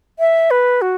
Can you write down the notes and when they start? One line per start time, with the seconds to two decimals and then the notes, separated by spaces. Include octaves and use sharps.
0.19 E5
0.51 B4
0.82 F#4